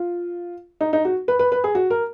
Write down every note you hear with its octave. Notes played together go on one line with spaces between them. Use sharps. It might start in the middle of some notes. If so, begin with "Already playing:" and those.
Already playing: F4
D#4
D#4
F#4
B4
B4
B4
G#4
F#4
A#4